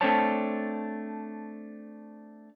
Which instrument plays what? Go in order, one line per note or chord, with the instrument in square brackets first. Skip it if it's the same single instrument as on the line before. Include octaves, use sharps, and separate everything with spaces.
[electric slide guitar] A3 C4 D4 C5 C#5 A5